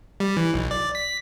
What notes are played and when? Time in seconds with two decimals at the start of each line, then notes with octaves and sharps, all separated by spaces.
0.20 G3
0.37 E3
0.54 B1
0.71 D5
0.95 B6